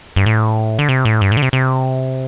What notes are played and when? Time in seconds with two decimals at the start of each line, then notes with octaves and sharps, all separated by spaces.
0.16 G2
0.26 A2
0.79 D3
0.89 C3
1.05 A2
1.21 G2
1.32 A2
1.37 D3
1.42 C3
1.53 C3